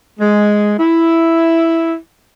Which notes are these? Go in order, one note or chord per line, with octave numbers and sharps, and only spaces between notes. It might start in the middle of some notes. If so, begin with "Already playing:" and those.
G#3
E4